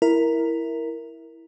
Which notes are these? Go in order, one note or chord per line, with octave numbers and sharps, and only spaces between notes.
E4 A#4